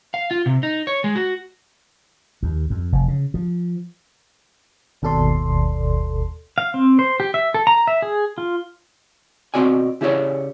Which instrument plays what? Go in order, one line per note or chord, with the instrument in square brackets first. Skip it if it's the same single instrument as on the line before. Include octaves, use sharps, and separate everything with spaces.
[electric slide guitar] F5
F4
C3
D#4
C#5
G#3
F#4
[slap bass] D#2
F2
F1
C#3
F3
[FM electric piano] G1 D#2 B2 A4 D5 C6
[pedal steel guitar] F5
C4
C5
G4
E5
A4
A#5
E5
G#4
F4
[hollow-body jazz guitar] B2 A#3 C4 F#4 D5 G#5
C#3 E4 G4 B4 C#5 D5